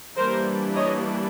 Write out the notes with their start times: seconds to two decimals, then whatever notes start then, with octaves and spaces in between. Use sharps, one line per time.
0.17 E3 G3 A#3 D4 A#4 C5
0.75 C#5 D#5